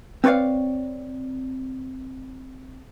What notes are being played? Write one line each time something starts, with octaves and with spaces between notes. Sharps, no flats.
C4 B4 C#5 D5 F5